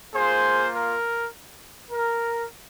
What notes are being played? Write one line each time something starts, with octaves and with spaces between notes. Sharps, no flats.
A#3 F4 G#4 C5
A#4
A#4